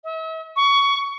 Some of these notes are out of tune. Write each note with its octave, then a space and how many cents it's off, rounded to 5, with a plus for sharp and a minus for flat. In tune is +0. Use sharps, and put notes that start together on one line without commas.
E5 -40
C#6 +20